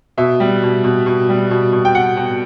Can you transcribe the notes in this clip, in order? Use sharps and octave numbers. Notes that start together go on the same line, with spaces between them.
B2 E5
G3
B2
B2
B2
G3
B2
B2
G5
B2 F#5
B2